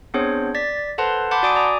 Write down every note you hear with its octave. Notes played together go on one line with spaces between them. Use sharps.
B3 C4 D4 G#4 C5 C#5
D5 A6 B6
A4 B4 C5 F#5 A5 C6
F#5 A5 B5 C6 D6 G6
F#4 D5 G#5 D6 D#6 D7
D5 G#5 A#5 D#6